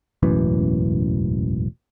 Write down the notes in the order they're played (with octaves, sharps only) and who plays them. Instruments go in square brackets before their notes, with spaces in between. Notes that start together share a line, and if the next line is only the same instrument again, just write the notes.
[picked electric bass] E1 A1 F#2 E3